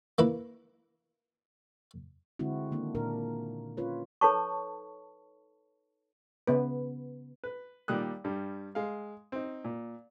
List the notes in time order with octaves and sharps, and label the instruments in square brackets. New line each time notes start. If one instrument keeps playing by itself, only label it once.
[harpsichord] A#3 E4 B4
[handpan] D3 G#3 C4 E4 F#4
D#3 A#3 D4
A#2 A#3 D4 A#4
C#4 F4 B4 C#5
[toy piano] D#4 A4 B4 C#5 A5 C#6
[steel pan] C#3 B3 B4
[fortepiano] B4
A#2 D#3 G3 D#6 F#6
G2 G3
G#3 F5
C4 D#4
A#2